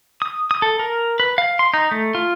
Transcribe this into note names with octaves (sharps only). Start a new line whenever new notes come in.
D#6
D#6
A4
A#4
B4
F5
C6
D#4
A3
F4